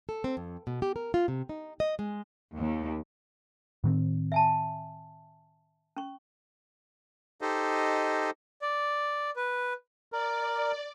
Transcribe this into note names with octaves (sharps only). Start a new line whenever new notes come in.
A4
C4
F2
B2
G4
A#4
F4
C3
D#4
D#5
G#3
D#2
A2 D#3 C4
E5 G#5 A5
C#4 C#6
D#4 G4 A4 C5 D#5
D5
B4
A#4 D5